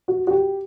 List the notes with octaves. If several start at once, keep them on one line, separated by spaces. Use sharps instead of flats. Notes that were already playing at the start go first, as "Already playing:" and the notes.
F#4
F#4
G4